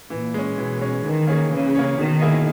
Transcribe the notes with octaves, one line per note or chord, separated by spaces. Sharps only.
A#2 E3
G#3 C#4
B2 E3
G#3 C#4
D#3 E3
A#3 C#4 G#4 C#5
C#3 E3
A#3 C#4 G#4 C#5
B2 D#3
A#3 E4 G#4 D#5